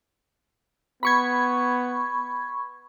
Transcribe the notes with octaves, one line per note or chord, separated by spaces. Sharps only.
B3 B5 C#6 G#6